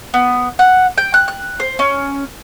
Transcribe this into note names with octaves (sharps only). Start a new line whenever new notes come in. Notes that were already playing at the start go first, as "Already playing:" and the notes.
B3
F#5
G5
F#6
F#6
C5
C#4